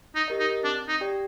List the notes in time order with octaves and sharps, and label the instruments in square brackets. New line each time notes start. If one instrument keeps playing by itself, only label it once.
[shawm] D#4
[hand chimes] G4 A#4 D#5
[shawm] D#4
[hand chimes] C4 [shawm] D4
[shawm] D#4
[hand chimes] G4 D5 G5